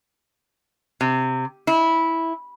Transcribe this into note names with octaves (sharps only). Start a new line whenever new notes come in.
C3
E4